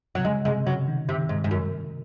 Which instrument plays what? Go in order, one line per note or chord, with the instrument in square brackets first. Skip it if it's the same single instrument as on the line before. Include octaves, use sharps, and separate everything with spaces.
[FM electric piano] C3 [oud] F#3
[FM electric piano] C#3 [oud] G#3
[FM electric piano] C3 [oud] G#3
[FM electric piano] C#3 [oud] F#3
[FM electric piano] D#3
[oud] C3
[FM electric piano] D#3
[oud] G#2
G#2
F#2